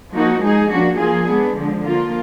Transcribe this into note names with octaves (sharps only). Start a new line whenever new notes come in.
F3 A#3 D#4 F#4
G#3 D#4 G#4
F3 A#3 D4 F#4
F3 A#3 F4 G#4
G#3 B3 D4
D3 F3 G#3
F3 A#3 F4